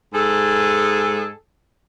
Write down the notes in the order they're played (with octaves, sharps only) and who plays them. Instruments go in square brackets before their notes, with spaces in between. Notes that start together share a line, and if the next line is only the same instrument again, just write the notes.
[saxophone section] G#2 G#4 A4